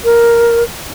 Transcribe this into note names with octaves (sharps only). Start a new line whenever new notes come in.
A#4